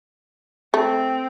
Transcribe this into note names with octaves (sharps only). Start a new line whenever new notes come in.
A3 C4